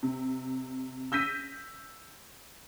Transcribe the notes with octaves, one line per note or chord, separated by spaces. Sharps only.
C3
E6 G6 A#6 B6 D#7